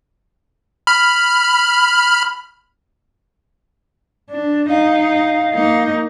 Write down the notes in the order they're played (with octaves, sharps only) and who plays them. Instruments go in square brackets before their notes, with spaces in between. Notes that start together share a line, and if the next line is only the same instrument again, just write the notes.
[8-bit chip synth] B5 F6
[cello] D4
[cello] D#4 [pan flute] F5
[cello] A#3 D#4